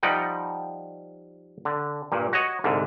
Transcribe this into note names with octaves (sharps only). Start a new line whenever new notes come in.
F3 G3 D#4 F#5 G5
D3
G2 A#2
F#4 C#5 D#5
C2 G#2 D3